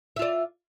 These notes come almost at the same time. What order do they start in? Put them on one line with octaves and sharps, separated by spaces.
E5 F4 D5